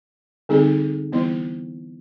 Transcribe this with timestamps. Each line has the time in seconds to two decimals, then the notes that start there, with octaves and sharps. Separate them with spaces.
0.49 D3 G3 C4 D#4 G#4
1.12 E3 G3 B3 E4